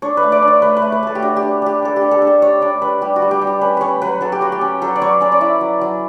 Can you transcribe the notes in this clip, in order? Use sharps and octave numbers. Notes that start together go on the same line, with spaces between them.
D4 C#5
B4
A3
D5
D4
C#5
A3 B4
B4
A3
B4
A3 A4
G4
D4 F#4
G4
D4
D4 G4
D4 A4
D4 G4
A4
D4
A4
D4 C#5
D4 D5
D4 B4
G3 G4
F#4
G3
G4
G3
G4
C#4 B4
C#4 B4 C#5
F#3 B4
F#3 A4
G4
F#3 F#4
G4
C#4
F#3 A4
D5
F#3 C#5
C#4 D5
D5
E4 E5
F#3
F#3